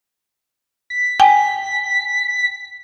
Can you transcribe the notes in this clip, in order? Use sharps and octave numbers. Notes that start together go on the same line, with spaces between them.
B6
G5 G#5